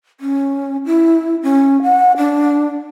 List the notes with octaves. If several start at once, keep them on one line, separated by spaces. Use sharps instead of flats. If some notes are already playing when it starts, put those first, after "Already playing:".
C#4
E4
C#4
F#5
D4